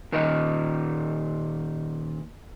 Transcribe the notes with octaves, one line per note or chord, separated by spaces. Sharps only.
A#2 D#3 D#4 D#5